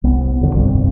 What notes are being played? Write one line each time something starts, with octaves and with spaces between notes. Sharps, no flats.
C2 B3
D#1 A#1 F2 D3
F1 C2 G2 C4